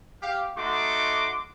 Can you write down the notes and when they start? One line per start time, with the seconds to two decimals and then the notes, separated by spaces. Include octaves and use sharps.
0.23 G4 F5
0.57 A3 D#4 F#4 C6 D6